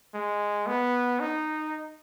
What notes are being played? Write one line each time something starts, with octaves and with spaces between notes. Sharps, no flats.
G#3
B3
D#4